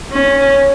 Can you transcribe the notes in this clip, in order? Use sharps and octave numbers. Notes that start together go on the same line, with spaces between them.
C#4